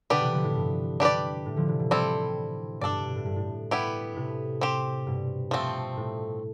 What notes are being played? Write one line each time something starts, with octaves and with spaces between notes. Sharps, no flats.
B2 D3 B3 D4 G4 B4
C3 E3
D3 F3
A2
G2
D4 G4 B4 D5
A2
D3 F3
C3 E3
B2 D3
A2 G3 C4 E4 A4
G2 B2 D4 A4 D5
B2
A2
G2
A2
B3 E4 G4
A2 C3
C4 G4 C5
G2 B2
F3 A3 C4
A2